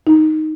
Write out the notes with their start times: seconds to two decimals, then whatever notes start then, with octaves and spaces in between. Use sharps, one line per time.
0.07 D#4